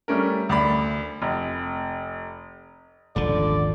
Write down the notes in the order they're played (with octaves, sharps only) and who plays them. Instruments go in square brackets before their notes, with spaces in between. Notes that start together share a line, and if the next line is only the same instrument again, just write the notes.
[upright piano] G3 A3 C#4 A#4
D2 D5 B5
F1
[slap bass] D#1 G#1 F3 [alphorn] D3 [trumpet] D5